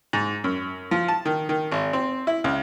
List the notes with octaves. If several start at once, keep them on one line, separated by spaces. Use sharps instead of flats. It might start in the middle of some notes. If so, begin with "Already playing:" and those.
G#2
F#2
F3
A5
D#3
D#3
G#1
C4
E4
C#2